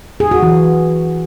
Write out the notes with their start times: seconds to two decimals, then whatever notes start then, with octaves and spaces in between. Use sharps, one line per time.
0.20 G#4
0.31 F#4
0.43 E3